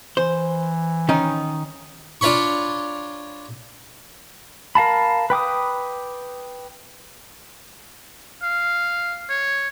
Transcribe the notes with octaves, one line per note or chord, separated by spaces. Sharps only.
E3 C5
D#3 C#4 D#4
D4 F4 C#5 B5 C#6
A#4 F5 A5 B5
B4 G5 D6 D#6
F5
C#5